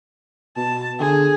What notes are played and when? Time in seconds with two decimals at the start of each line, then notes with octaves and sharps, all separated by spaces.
0.57 B2 A5
1.00 D3 G#4